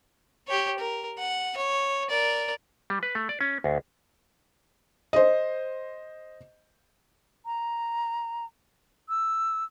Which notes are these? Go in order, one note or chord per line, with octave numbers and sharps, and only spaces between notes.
G4 C#5
A#4
F#5
C#5
A#4 D5
G3
B4
A3
D5
C#4
D2
C5 D#5
A#5
E6